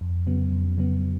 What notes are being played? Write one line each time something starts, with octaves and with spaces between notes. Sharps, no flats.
F2
C#3 F#3 B3
F2
C#3 F#3 B3